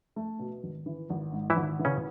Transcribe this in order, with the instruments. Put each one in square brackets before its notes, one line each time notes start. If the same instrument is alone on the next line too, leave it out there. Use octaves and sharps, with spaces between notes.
[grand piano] A3
B2
G#1
E3
G#1
G#2
[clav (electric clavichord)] E3 E4
[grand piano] G#1
E3
[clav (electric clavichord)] C#3 C#4